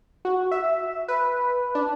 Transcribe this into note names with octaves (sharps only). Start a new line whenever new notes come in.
F#4
E5
B4
D4